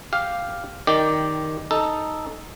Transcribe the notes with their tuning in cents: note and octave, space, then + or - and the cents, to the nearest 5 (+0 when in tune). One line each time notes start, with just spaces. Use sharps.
G4 +0 F5 +0
D#3 +0 G4 +0 D5 +0
D#4 +0 A4 +0